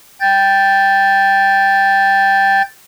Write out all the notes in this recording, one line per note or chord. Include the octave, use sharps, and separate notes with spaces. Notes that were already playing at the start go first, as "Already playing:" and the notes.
G5 G6 A6